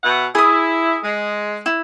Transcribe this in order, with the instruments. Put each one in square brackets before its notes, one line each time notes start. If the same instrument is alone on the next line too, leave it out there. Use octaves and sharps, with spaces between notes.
[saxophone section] B2 E4 F#5
[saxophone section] E4 [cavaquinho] G#4 D#6
[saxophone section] G#3
[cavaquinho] E4